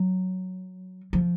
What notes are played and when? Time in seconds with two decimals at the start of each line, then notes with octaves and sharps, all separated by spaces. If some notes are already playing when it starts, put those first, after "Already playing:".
Already playing: F#3
1.13 F3